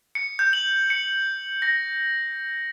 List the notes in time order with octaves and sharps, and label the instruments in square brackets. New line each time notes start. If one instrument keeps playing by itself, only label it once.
[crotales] C#7
G6
F#7
C#7
A#6